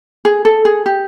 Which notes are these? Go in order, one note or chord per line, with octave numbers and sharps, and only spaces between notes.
G#4
A4
G#4
G4